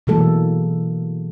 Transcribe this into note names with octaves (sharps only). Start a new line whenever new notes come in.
B2 E3 F#3 G#3 A#3 A4